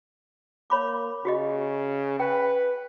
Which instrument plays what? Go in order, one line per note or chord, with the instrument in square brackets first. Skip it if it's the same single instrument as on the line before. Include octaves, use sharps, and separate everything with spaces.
[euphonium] A#3 [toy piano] C#5 B5 D6
[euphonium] C#3 [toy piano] F#4 G4 D#5
[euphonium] B4 [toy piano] G5